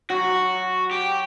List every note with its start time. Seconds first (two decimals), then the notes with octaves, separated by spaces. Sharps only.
0.10 F#3 F#4
0.91 G4